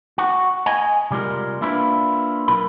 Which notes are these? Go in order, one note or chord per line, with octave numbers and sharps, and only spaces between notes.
F#4
D#5 G#5
C3 G3 G#3 F4 A#4
A#3 D4 E4 F4 G4 B4
B1 F4 A#4 B5